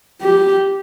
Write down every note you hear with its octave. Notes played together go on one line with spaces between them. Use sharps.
G4